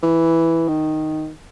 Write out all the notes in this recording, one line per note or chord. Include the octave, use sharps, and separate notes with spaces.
E3
D#3